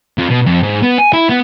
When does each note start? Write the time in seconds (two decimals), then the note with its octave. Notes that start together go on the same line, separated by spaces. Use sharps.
0.18 F2
0.30 B2
0.46 F2
0.63 G#2
0.83 B3
0.99 G#5
1.13 E4
1.29 B3